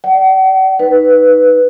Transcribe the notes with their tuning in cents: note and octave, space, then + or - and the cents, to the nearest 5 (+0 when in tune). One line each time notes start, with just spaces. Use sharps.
D5 +0 F#5 +45
D#4 +0 B4 +0